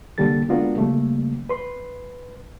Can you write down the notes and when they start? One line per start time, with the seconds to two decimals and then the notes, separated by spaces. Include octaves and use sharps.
0.18 C2 D3 G3 A#3 A4 A6
0.49 G#3 B3 D4 F4 F#4 A#4
0.77 C#3 G3 A3 A#3
1.49 B4 C6